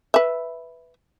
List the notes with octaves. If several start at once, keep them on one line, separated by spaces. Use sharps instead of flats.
B4 E5